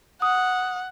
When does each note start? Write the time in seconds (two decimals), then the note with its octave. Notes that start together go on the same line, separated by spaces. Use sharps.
0.22 F#5 D#6